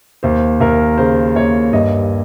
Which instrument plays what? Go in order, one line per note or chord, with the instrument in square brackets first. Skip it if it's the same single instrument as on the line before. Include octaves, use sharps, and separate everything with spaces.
[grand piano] D#2 C5
D#2 A#4
C#3 C5
D#2 C#5
G2 D#5